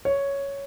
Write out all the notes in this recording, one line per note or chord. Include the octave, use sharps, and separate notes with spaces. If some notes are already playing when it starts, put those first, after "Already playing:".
C#5